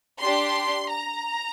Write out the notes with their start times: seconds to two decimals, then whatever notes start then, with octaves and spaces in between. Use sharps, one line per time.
0.22 D4 G4 C6
0.92 A#5